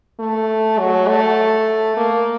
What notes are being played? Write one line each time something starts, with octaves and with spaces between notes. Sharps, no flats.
A3
F#3
A3
A#3